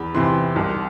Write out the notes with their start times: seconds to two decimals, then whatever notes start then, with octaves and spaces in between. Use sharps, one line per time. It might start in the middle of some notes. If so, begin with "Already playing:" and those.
Already playing: E2 B5
0.15 C3 E3 C6
0.56 C2